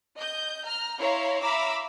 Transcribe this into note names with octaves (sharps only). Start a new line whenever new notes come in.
D#5 G6
A#5 F6
E4 C#5 F5 A#5 C6
E5 F5 A#5 B5 D6 E6